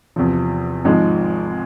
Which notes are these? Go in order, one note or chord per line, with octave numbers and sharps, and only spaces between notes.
E2 C3 F3
G#1 G#2 F3 G#3